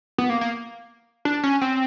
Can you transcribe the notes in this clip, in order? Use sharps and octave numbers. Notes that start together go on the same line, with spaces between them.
B3
A#3
A#3
D4
C#4
C4